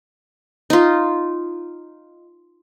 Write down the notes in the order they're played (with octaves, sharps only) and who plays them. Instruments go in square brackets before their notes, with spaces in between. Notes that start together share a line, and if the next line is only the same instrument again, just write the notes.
[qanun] D#4 F4